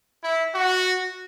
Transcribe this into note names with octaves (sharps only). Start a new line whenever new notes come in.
E4
F#4